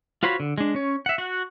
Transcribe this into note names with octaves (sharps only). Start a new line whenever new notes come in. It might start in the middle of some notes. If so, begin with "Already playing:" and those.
F4 F#4 C5 C#5 B5
D3
G#3 D4
C#4 C#5
E5 F#5
F#4 F#5